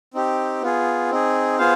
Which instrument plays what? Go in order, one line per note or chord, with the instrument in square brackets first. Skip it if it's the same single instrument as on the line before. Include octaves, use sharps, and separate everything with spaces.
[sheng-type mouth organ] C4 D#4 G4
B3 F4 G#4
C4 D#4 G#4
B3 F4 G#4 C5 F5